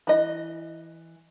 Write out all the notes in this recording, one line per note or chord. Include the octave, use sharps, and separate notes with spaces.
E3 D#5